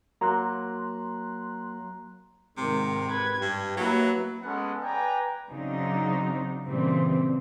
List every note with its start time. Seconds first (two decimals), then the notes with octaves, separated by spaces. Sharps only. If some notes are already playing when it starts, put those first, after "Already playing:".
0.21 F#3 A#3 A#5 C6 F#6
2.57 G#2 C3 D#3 A#4
3.10 B4 G#6
3.42 G2 G4
3.77 F#3 A#3 E4 B4
4.43 G#3 B3 C#4 A4 F#5
4.83 B4 D5 G5 G#5 A#5
5.50 C#3 F#3 C4 D4 D#4
6.65 A#2 C#3 E3 G3 C4